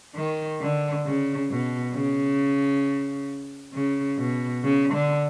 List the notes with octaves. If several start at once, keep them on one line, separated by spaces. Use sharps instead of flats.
D#3
D3
C#3
B2
C#3
C#3
B2
C#3
D3